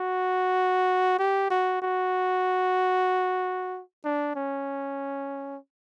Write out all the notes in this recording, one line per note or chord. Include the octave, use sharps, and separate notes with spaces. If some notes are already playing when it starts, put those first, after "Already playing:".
Already playing: F#4
G4
F#4
F#4
D4
C#4